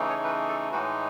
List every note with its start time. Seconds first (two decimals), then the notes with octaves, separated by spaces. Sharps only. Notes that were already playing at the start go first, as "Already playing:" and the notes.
Already playing: C#3 E3 A3 D#4
0.09 C#5
0.24 B4
0.49 A4
0.72 A2 E3 G#3 D#4 F#4